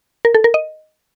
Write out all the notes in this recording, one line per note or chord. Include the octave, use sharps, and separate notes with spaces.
A#4
A4
A#4
D#5